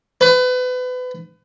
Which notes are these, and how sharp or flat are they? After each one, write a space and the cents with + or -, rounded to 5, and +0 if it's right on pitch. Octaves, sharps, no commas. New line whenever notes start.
B4 +30